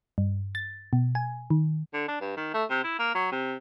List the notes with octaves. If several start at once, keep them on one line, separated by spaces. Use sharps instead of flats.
G2
A6
B2
G#5
D#3
D3
D4
G2
D#3
A3
C3
E4
A#3
F#3
C3